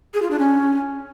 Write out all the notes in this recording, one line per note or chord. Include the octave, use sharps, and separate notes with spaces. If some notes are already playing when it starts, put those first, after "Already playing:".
G#4
F4
D4
C#4